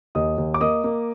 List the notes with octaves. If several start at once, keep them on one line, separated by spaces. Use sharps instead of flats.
D#2 D#5 D#6
D#2
D6
A#3 D#5 D#6
A#3